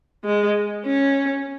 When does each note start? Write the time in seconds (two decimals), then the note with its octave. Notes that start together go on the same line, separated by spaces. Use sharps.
0.25 G#3
0.85 C#4